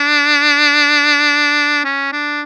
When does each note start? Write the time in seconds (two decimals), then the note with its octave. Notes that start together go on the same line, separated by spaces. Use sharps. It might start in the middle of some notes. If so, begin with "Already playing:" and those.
Already playing: D4
1.85 C#4
2.12 D4